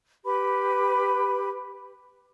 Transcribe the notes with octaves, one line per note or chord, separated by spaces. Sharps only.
G4 B4 B5